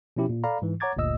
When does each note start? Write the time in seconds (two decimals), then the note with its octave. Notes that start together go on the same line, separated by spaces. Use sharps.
0.17 B2 F3 C#4 E4 G4
0.29 A#2
0.44 A4 D5 F5 A#5 B5
0.62 G#2 E3
0.80 C#5 F#5 A#5 D6 G#6 A6
0.97 G1 D2 A#2 D#5 E6